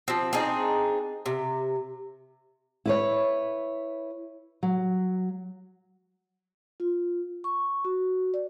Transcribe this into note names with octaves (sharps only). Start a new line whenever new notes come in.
F3 C4
C4 D4 D#4 G#4
C3
E4 B4 C#5
F#3
F4
C#6
F#4
D5